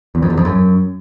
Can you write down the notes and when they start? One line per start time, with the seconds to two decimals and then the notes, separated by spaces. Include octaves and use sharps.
0.15 E2
0.22 F2
0.30 E2
0.37 F2
0.45 F#2